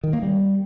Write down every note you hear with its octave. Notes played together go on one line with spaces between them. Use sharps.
D#3
A#3
G3